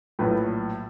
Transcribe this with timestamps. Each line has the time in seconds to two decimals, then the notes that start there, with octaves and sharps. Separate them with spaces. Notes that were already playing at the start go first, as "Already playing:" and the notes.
0.19 A#1 A2 F#3 B4